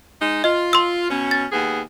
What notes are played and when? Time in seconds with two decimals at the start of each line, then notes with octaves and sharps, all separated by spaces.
0.20 G#3 D#4
0.44 F4 D#5
0.73 C6 E6
1.10 B2 C#4
1.31 A6
1.52 D#2 B3 G#4